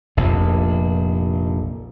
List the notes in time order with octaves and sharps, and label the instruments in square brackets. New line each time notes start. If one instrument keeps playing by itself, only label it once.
[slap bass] F1 A#1 F2